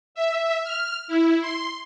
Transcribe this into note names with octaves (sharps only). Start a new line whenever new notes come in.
E5
F6
E4
C6